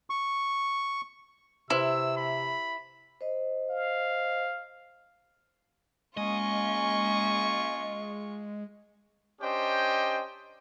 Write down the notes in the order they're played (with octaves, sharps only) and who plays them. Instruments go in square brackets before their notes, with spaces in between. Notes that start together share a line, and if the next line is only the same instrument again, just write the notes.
[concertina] C#6
[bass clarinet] C3 [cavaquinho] E4 [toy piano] B4 C5 C6 [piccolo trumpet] E6
[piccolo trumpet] B5
[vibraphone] C5 D#5
[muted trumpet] F5
[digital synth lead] G#3 [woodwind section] A#3 C#4 G#5 [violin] F4 C#6 [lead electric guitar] D#5
[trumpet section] C#4 D4 G4 C5 D#5 G5